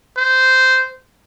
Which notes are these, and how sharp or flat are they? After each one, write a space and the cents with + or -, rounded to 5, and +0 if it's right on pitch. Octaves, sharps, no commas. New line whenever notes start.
C5 -10